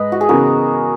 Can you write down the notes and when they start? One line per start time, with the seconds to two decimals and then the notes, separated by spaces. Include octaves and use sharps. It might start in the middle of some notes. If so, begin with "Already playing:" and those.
Already playing: G#2 G#3 B4 D#5
0.12 F#4
0.21 G#4
0.29 C#3 E3 B3 F#4 A#4